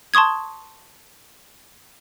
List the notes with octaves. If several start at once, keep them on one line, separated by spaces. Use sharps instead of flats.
A5 C6 C#6 D#6 G#6